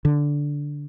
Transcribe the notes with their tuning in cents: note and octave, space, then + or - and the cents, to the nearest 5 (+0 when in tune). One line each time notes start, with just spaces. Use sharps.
D3 -10